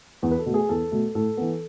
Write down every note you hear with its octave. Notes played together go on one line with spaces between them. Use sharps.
E2
B4
A4
B2 A3
G#4
E2 A4
B2 A3
A2 A4
E3 B3